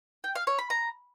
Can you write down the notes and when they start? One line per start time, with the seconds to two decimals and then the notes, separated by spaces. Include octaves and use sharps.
0.24 G5
0.35 F5
0.47 C#5
0.59 B5
0.70 A#5